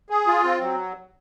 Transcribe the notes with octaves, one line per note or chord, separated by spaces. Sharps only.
G#4
F4
C4
F#3